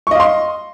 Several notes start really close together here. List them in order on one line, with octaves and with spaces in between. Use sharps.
C#6 D#5 F5 C6